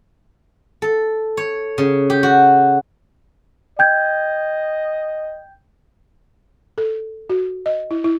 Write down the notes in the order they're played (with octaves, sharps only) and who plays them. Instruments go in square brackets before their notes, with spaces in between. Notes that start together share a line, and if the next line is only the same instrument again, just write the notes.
[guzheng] A4
C#5
C#3
G4
F#4
[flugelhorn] D#5 [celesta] G5 G6 G#6
[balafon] A4
F#4
D#5
E4
E4